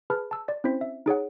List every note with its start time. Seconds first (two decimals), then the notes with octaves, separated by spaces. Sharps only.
0.10 G#4 B4 A5 B5 F6
0.31 A5 E6
0.48 D5 A6
0.64 C4 C#4 E4 C5 B6
0.81 E5
1.06 D#4 G#4 C#5 F#5